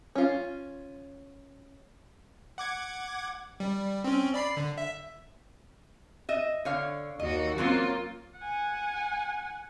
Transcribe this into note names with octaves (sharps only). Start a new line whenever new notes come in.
C#4 F4
F#5 D6 G#6
G3
C4 C#4
D5 B5 C7
D3
E5
D#5 E5
D3 C#5 F5
D#2 F#4 D#5
F#3 A#3 C4 C#4 F4
F#5 G#5